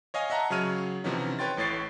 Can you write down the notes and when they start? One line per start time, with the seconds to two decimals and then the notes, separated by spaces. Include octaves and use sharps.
0.14 C#5 D#5 F5 G#5
0.30 D#5 E5 F#5 A5 A#5
0.50 C#3 F#3 C#5 F6 D#7
1.04 C3 E3 F3 B3 C#4 D#4
1.39 B4 C#5 G5 C6 A6
1.57 A1 A2 C#5 A6 C7